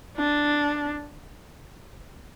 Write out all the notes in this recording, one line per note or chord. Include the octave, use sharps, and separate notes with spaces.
D4